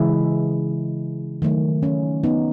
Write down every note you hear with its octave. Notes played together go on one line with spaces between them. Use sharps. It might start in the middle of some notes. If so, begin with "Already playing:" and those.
Already playing: C#3 E3 G#3 E4 G#4
D#3 F#3 A3
C#4
B3 D#4